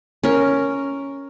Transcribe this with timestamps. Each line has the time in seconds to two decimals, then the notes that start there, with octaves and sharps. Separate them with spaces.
0.23 C#4 A#4